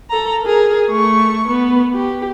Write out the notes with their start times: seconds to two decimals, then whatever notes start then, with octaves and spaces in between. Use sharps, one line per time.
0.10 A4 A#5
0.42 G#4 A#4
0.89 A3 C#6
1.48 B3
1.94 G4